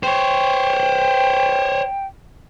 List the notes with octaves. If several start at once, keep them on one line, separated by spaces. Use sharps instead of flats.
C5 C#5 G5